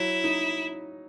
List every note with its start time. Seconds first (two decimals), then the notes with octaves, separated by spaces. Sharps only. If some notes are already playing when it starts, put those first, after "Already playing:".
Already playing: F#3 E4
0.24 D#4